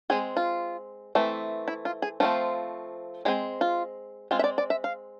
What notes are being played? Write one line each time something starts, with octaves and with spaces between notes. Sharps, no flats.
G#3 C4 G#4
F4
E3 A3 C4
E4
F4
G#4
F3 A3 C4 F4
G#3 C4 G#4
F4
G#3 C4 F4
E5
D5
D5
E5
F5